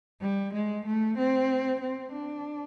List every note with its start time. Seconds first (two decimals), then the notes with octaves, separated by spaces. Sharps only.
0.22 G3
0.54 G#3
0.86 A3
1.18 C4
1.81 C4
2.13 D4